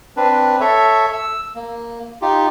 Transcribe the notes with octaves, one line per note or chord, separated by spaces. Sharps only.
C4 D4 B4
A4 C#5 E5
E6
A#3
D#4 F4 G4